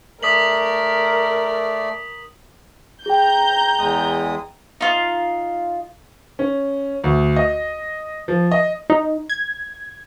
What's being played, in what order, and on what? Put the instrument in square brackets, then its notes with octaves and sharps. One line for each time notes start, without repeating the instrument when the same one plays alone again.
[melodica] A3 D5 [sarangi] A#4 [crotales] D#6 B6 F#7
[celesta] G#4 G5 [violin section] A#5 G6
[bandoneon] E2 G#3 D#6
[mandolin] D#4 F4
[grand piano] C#4
D2
D#5
F3
D#5
[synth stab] D#4
G#6